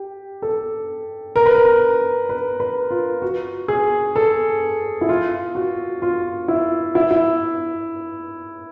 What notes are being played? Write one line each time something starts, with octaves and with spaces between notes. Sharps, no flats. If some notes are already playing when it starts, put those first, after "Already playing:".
Already playing: G4
A4
A#4
B4
A#4
B4
B4
F4
F#4
G#4
A4
E4
F4
F#4
F4
E4
E4
E4